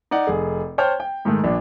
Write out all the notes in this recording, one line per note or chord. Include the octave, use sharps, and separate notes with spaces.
D#4 D5 F#5
F1 G#4
C5 C#5 G5 A5 F6 G6
G5
G#2 D#3 G#3 A3
A#1 D4